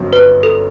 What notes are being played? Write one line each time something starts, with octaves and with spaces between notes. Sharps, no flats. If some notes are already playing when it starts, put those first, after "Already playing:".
Already playing: G1 F#2 F#3 C4
B4
A4